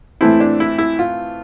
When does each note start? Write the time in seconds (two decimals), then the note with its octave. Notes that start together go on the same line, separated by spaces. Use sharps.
0.21 A2 E3 A3 C4 E4
0.40 D4
0.60 E4
0.78 E4
0.99 F4